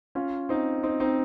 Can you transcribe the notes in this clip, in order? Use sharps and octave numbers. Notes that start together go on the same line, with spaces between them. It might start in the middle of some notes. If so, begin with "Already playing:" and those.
C#4 F4
C4 D#4
C4 D#4
C4 D#4